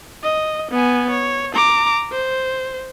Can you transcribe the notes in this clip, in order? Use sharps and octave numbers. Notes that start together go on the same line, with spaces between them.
D#5
B3 G#5
C#5
A#5 D6
C5